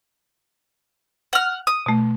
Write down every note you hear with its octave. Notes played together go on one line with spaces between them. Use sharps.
F#5 F6
D#6
B2 A3